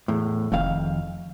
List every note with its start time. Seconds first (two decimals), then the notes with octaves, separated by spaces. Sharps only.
0.08 E2 A2
0.52 F1 F2 D#3 F5